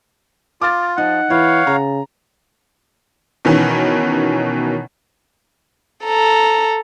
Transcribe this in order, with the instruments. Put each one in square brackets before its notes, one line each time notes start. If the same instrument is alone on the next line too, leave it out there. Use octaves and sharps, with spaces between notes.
[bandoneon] F4 [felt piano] D6 F6 A6
[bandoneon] F3 [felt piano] D#4 [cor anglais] F#5
[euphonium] E3 [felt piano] E4 [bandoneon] C#5 F5
[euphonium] C#3 [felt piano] A#5
[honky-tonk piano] B2 D#3 E3 C#4
[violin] A4 A#5